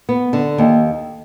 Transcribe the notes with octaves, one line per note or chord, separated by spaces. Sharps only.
B3
D3
D#2